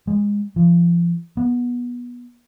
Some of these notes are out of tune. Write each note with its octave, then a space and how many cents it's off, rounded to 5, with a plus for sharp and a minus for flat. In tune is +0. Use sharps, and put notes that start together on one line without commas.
G#3 -20
F3 -30
B3 -20